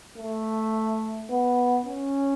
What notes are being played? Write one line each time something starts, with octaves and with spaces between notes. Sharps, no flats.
A3
B3
C#4